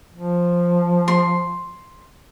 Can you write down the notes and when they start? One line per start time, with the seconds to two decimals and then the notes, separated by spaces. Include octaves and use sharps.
0.13 F3
1.08 C6